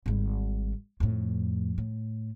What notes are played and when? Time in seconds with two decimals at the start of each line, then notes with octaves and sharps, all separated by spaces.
0.06 G#1 G3
1.00 F2 A2
1.78 A2